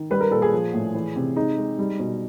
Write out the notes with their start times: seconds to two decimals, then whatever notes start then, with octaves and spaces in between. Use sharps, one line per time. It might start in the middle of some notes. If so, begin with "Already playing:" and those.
Already playing: D#3
0.10 G3 B4
0.21 A#4
0.31 A#2 A4
0.42 G#4
0.52 F3
0.73 A2
0.94 E3
1.16 C3
1.36 G#3 D#4
1.57 G#3
1.79 G3
1.99 B2